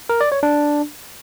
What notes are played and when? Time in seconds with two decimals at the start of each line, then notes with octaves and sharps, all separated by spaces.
0.09 A#4
0.21 D5
0.32 C#5
0.43 D4